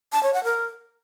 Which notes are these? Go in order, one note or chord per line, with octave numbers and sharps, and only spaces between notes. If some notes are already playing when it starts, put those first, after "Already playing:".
A5
C#5
F#5
A#4